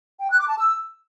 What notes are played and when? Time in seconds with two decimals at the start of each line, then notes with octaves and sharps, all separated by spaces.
0.21 G5
0.30 F#6
0.40 D6
0.49 A5
0.58 E6